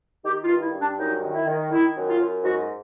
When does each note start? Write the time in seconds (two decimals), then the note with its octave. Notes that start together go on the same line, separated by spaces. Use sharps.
0.24 D#3 G4
0.42 F4
0.48 G2
0.61 E4
0.73 G2
0.79 D4
0.97 F#2 D#4
1.22 D#3
1.34 E4
1.47 D#3
1.71 D#3 E4
1.95 F#2
2.07 F4
2.20 F#2
2.44 G#2 F#4